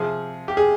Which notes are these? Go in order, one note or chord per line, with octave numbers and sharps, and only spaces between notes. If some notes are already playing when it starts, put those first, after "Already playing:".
Already playing: C3 F3 G#4
G4
G#4